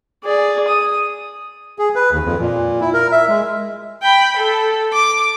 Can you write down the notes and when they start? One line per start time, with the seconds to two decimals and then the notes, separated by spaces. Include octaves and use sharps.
0.24 G#4 D5
0.67 D#6
1.79 G#4
1.96 B4
2.11 D#2
2.24 F2
2.39 A#2
2.81 E4
2.94 A#4
3.12 E5
3.29 G#3
4.03 G5 B5
4.37 A4
4.93 D6